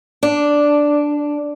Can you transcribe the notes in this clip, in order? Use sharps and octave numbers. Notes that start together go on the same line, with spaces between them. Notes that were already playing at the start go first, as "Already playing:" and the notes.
D4